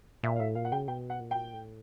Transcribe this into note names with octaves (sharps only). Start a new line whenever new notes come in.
A#2 E5
F5
A2 E5
A#2 F5
F#5
C#3 G5
B2 G5
F#5
A#2
G5
A2